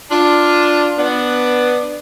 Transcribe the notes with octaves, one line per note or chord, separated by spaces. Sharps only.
D4 F4
B3 D4